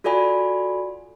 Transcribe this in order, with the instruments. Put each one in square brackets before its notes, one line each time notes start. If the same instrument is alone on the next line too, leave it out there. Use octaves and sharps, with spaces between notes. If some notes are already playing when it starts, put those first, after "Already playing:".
[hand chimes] F4 F#4 A4 D5 G#5 B5